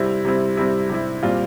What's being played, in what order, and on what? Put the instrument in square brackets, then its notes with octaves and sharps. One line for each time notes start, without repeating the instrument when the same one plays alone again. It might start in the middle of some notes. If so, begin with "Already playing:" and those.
Already playing: [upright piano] C3 G3 C4 E4
C3 G3 C4 E4
C3 G3 C4 E4
C3 G3 C4 E4
A#2 G3 C4 F4